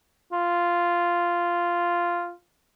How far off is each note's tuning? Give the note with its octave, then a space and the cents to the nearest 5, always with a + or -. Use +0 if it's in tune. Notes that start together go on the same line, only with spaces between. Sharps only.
F4 -5